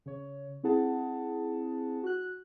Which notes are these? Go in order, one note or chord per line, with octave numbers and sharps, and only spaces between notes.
C#3 C#5
C4 E4 G#4 F#5 A5
F#4 F#6